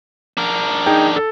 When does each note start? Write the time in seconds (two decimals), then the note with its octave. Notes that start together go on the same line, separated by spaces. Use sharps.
0.37 D4 A#4
0.86 D#4 G#4 G5
1.16 A4